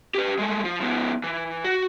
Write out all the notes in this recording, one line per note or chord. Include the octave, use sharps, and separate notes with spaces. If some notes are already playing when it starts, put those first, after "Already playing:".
G4 B4
G#3 A3
F3
F3 B3
E3
F#4